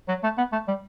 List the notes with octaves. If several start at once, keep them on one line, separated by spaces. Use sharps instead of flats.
F#3
A3
B3
A3
G3